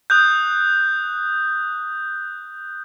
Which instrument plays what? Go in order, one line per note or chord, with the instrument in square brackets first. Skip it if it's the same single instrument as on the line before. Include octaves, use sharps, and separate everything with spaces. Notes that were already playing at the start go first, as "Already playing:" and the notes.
[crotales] D#6 F#6 G6